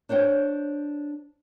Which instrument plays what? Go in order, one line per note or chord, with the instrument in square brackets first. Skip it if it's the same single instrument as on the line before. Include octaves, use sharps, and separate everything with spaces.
[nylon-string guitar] D4 C5 C#5 G5